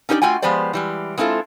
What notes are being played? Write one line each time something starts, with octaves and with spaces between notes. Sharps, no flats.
C#4 D#4 G4 C5 D5
A3 F4 F#4 G5 G#5
F3 G#3 B3 G4 C5 D5
E3 G3 G#3
G#3 C4 E4 F4 A4